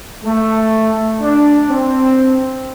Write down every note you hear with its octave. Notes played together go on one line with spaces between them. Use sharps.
A3
D4
C4